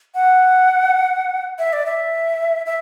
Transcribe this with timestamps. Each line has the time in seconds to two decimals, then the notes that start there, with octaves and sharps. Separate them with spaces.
0.15 F#5
1.59 E5
1.73 D5
1.86 E5
2.66 E5